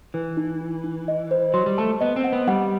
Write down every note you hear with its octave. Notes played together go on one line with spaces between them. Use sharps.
E3 B4
D#4
D#4
D#4
D#5
C5
F#3 C6
G3
A3 A5
B3 D#5
C4
F#5
B3
G3 F#5